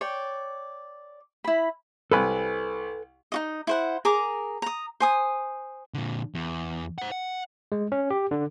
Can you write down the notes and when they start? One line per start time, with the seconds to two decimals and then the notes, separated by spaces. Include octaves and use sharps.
0.01 C#5 D5 G5
1.44 E4 B5
2.11 C2 A4 B4 G#5 B5 F#6
3.32 D#4 F#4 D#5
3.67 E4 C5 F#5
4.05 G#4 A#4 A#5 D6
4.62 A#5 D#6
5.00 C5 G#5 D#6
5.94 A#2 D3
6.35 E2
6.98 C5 F#5
7.12 F#5
7.72 G#3
7.92 C#4
8.11 G4
8.31 D3